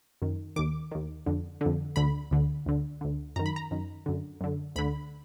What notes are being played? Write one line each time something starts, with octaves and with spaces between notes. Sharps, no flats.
F#2 D#3
D#2 D#3 D6
D#2 D#3
F2 D3
F2 D3
D2 D3 B5
D2 D3
D2 D3
D2 D3
F#2 D#3 A#5
B5
A#5
F#2 D#3
F#2 D3
F#2 D3
D2 D3 B5